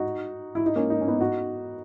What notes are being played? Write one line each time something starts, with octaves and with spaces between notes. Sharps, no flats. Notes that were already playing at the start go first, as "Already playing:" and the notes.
Already playing: D#4 F#4
E4
D#4
A#3 C#4
D#4
C#4
B3 D#4
D#4 F#4